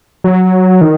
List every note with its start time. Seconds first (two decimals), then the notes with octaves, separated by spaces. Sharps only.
0.24 F#3
0.81 D#3